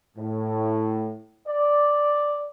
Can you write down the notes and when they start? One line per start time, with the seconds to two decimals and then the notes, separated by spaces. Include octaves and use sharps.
0.17 A2
1.47 D5